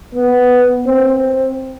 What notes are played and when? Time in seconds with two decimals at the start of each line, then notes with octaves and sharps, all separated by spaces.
0.15 B3
0.86 C4